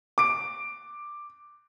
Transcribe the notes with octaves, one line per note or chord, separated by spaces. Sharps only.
D6 D7